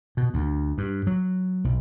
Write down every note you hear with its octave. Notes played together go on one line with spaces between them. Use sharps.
B2
D2
G2
F#3
B1